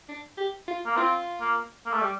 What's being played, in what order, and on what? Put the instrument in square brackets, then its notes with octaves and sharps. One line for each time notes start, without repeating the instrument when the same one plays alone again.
[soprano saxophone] D4
G4
F4
[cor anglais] A#3
[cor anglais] C4 [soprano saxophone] F4
[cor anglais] A#3
A#3
A3
G3